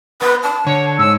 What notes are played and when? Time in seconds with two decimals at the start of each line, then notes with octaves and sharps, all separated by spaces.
0.22 B3 B4
0.43 A5
0.67 D3 C#5
0.99 G#2 E6